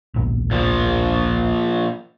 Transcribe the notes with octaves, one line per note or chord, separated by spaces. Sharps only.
D1 A#1
A#2 F3